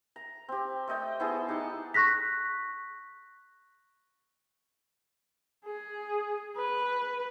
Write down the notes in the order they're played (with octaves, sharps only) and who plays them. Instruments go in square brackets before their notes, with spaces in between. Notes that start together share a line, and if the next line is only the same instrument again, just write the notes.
[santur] A#5
C4 G4
A3 D5 D#5 G5
B3 E4 G#4 A5
D#4 G4 F#5 A5
[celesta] C#6 F#6 A#6 B6
[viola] G#4
B4